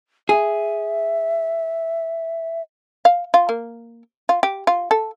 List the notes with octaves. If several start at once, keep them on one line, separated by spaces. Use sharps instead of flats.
G#4 E5
F5
F4
A#3
F4
G4
F4
A4